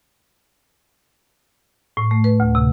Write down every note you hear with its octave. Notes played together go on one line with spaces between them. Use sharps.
A2
A3
B4
D2
C3